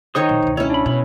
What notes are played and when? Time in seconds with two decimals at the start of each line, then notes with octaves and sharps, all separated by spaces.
0.15 D#3 D#4 C5 C#5 C#6 D#6
0.29 A#1
0.42 E1 C#2
0.57 C#4 E4 C#5
0.70 D4 B5
0.86 B2 C#5 B5